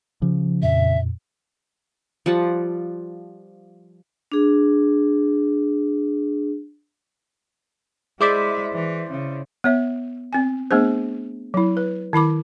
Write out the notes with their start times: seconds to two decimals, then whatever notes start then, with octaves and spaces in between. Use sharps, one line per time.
0.22 C#3 F3
0.62 F2 A#2 E5
2.26 F3 G3 F#5 A5
4.32 D4 G#4
8.20 G#3 E4 G#4 C5 D5 E5 D6 B6
8.73 E3
9.11 C#3
9.64 B3 C#5 E5
10.33 C4 G#5
10.71 A3 B3 D4 G#4 C5
11.54 F#3 E4
11.77 B4
12.13 D#3 E4 B5 D6